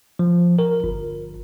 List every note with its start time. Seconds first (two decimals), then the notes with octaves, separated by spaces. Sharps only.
0.19 F3
0.59 A#4
0.84 G1